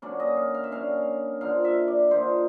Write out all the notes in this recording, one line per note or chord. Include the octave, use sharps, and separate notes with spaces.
D3 F#3 A#3 C#4 D5
D#5
F5
F5
E5
D3 F#3 A#3 C#4 F5
D3 F3 A#3 D#4 F5
E5
D5
D3 F3 A#3 D#4 C5